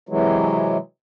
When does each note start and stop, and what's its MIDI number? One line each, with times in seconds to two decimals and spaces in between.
0.09 0.77 48
0.09 0.77 52
0.09 0.77 54
0.09 0.77 56